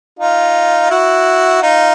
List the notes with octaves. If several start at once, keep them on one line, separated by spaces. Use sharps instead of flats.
D#4 F4
E4 F#4
D#4 F4